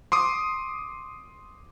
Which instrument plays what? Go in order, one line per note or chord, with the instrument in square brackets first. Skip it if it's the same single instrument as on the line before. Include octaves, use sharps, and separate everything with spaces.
[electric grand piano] C6 D6 D#6